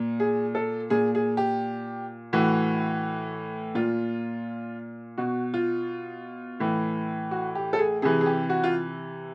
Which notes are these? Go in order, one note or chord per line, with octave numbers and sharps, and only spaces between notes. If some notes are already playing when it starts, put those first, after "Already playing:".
Already playing: A#2
G#4
A4
A#2 G#4
G#4
G4
A2 E3 F#4
A#2 F4
B2 F#4
F4
A2 E3
F#4
G4
A4
G#4
C3 E3 G#4
G#4
G4
F#4
F4